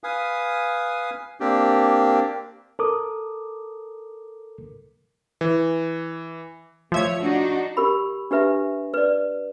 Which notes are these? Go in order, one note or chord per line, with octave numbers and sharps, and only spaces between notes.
B4 F5 G#5 D#6
A#3 C4 D4 G4
A4 A#4 D6 D#6
E3
F3 A3 C#5 E5 G#6
D4 D#4 F#4
G4 A#4 B5
D4 G4 B4 E5 A#5
B4 D5